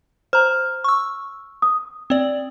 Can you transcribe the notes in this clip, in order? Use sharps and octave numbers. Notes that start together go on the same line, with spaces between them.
C5 A#5 F6
C#6 E6
D#6
C4 D5